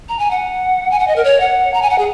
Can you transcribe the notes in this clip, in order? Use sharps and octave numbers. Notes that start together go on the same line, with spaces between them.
A#5
G#5
F#5
G#5
F#5
D#5
A#4
C#5
F#5
A#5
G#5
F#5
G#4